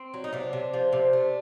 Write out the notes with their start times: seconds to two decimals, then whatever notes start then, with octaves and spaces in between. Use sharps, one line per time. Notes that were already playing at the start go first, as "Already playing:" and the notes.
Already playing: C4
0.14 F#3
0.24 D#4
0.33 C3 D4
0.53 C3
0.74 F3
0.92 C3
1.13 A3